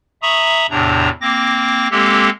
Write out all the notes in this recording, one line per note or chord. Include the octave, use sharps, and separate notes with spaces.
E5 A#5 B5 C#6 D#6
E2 A2 C3 D4 A#5
A#3 C4 D6 A#6
G#3 A#3 C4 G4 A4